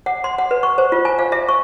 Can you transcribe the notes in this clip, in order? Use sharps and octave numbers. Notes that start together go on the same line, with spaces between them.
F#5
C6
F#5
B4
C#6
C5
F4
G#5
F5
E5
C#6